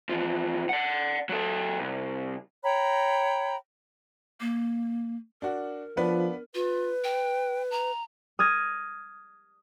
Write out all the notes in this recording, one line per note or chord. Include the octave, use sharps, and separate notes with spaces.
E2 F3
D5 F#5
F#3 A4
C2
C#5 G5 A#5 B5
A#3
D4 F#4 A#4
F3 B3 D4 B4
F4 B4
G5
A#5
D#6 F6 G#6 A#6